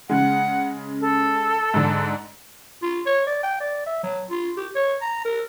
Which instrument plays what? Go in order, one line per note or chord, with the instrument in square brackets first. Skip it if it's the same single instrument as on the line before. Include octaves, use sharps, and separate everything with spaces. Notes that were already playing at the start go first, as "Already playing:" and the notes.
[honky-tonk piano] C#3 G#3 [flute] F#5
[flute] A4
[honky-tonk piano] G#2 D3
[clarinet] F4
C#5
D5
G5
D5
E5
F#3
F4
G4
C#5
A#5
A#4